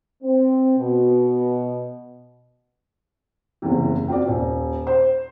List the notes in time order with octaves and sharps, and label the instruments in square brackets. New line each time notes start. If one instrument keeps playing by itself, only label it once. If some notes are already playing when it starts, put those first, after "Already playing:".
[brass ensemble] C4
B2
[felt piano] F#1 E2 C3
C4 F4 F#4 D5
D#1
C5